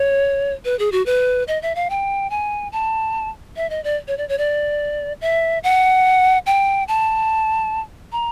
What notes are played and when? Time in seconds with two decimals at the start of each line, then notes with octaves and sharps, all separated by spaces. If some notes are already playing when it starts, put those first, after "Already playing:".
Already playing: C#5
0.65 B4
0.79 G#4
0.92 F#4
1.06 B4
1.48 D#5
1.62 E5
1.75 F5
1.90 G5
2.30 G#5
2.72 A5
3.56 E5
3.70 D#5
3.84 D5
4.08 C#5
4.18 D5
4.29 C#5
4.38 D5
5.21 E5
5.63 F#5
6.46 G5
6.88 A5
8.12 A#5